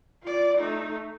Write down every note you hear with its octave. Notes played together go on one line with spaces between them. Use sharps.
F4 D5
A3 D#4